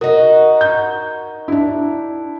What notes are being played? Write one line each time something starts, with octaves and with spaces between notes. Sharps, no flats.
D#4 F#4 A#4
G6
D4 E4